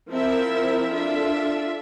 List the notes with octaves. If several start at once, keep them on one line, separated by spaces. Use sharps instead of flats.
F3 C4 E4 A#4 E5
D4 F4 A4 E5